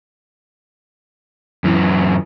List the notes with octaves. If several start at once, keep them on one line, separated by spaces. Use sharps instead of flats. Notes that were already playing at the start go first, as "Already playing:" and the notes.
F#2 E3